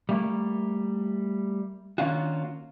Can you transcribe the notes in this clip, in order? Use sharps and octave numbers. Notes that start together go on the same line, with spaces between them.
G3 A3 A#3
D#3 A#3 C#4 D4 F4 F#4